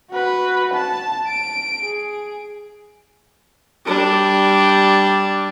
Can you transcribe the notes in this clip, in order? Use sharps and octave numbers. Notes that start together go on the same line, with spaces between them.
F#4 B4
A5
D7
G#4
G3 D4